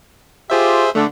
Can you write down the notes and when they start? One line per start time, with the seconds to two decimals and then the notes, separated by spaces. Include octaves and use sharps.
0.50 F4 G4 G#4 C5 E5
0.95 D3 A3